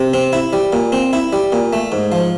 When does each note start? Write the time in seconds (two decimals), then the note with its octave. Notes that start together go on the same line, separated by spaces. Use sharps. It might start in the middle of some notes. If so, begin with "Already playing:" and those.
Already playing: C3
0.14 C4
0.33 E4
0.53 G3
0.73 A#2
0.92 C4
1.13 E4
1.33 G3
1.52 A#2
1.73 A3
1.92 G#2
2.12 F3